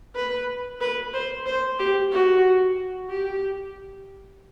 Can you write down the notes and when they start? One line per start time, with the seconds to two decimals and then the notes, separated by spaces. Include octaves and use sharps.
0.15 B4
0.81 B4
1.14 C5
1.46 C5
1.79 G4
2.12 F#4
3.10 G4